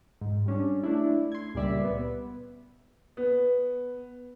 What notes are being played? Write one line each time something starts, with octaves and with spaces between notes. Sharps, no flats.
G#2
G3 C#4 D4
A3 D4 E4
C6 G#6
C#2 A#2 G3 D5 E5 B6
B3 B4
B3